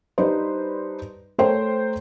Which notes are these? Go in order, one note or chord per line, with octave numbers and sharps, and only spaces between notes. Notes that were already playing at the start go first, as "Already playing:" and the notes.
G3 D4 D#4 B4 C5
A3 A#4 C5 C#5 G5